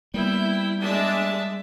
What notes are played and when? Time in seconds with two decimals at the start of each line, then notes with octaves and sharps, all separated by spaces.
0.14 G3 A#3 B3 E4 G5
0.82 G#3 D4 E5 A5